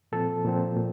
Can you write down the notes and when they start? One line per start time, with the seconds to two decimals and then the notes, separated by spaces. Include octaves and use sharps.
0.12 A#2 F3 C4 A4
0.45 A#2 F3 C4
0.77 A#2